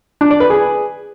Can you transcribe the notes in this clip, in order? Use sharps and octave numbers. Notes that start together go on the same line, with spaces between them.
D4
D5
B4
G#4